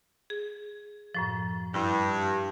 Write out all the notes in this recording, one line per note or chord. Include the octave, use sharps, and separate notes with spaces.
G#4
F#2 A2 F3
G2 E4